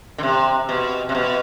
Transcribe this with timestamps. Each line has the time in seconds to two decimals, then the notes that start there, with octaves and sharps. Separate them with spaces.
0.18 D3
0.23 C3
0.69 B2
1.09 C3
1.15 B2